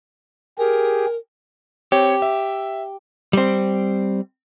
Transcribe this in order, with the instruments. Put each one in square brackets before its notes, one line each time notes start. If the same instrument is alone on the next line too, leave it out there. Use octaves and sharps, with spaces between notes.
[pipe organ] G4 G#4 [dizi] A#4
[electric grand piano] C4 C#5 [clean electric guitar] G4
[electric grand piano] E5
[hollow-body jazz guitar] G3 C4